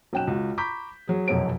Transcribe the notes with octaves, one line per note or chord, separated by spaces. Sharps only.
B1 C#4 G5 F#6 E7
C#2 F#4
A#5 B5 C#6 D6 G6 B6
F#3 G#4
F1 B1 F#2 F#4 C#5 D7